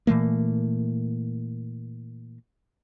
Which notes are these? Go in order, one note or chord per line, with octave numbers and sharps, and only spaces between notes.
A#2 E3 A3 A#3